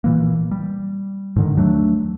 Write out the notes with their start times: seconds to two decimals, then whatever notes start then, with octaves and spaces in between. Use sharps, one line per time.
0.04 A#2 E3 A#3
0.51 G3
1.36 G#2 D3 D#3
1.57 D#2 F#3 A3 D4